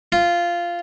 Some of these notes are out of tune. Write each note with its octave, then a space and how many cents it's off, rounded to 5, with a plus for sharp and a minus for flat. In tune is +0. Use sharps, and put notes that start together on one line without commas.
F4 -10